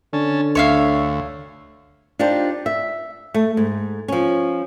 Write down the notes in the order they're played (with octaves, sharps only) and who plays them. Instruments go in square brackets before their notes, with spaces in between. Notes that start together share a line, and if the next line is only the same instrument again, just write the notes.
[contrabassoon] D3 [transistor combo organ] C#4 A5
[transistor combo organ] D2 [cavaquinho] C#5 E5 F5
[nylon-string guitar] D4 D#4 F4 G4 C5
E5
A3
G#2
F3 C#4